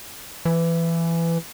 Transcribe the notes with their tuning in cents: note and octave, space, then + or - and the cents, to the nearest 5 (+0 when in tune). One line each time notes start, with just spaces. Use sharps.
E3 +20